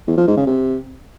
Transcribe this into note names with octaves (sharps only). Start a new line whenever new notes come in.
E2
F3
G#2
C#3
C3